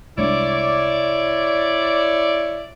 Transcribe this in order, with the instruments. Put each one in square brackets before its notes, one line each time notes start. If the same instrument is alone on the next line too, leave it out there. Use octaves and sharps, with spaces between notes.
[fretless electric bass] C2 G#3 D4 [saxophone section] E4 C#5 D5